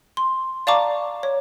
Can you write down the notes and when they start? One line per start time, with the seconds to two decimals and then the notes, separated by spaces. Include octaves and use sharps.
0.17 C6
0.67 D5 F5 A5 A#5 C#6 D6
1.23 C#5